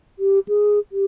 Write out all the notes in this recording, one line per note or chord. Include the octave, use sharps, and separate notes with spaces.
G4
G#4
G4